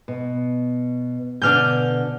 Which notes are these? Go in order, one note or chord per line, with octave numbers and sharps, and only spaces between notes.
B2
B2 D3 D4 G#5 F6 G6